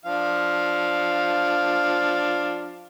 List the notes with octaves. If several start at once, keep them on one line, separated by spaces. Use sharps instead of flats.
F3 D4 F5